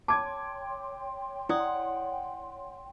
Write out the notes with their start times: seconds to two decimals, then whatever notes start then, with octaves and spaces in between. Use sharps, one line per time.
0.08 C#5 G5 A5 C6 D6 G#6
1.49 E4 D5 F#5 D#6